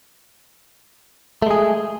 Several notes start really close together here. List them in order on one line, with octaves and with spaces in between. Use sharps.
A3 G#3 G#4